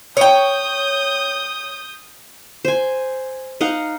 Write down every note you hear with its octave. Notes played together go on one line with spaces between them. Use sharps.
C#5 G5 D#6 G6
C5 G#5
D#4 F5 F#5